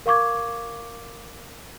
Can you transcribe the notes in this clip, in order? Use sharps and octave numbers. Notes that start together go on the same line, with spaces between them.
A#4 F5 C#6 D6 G#6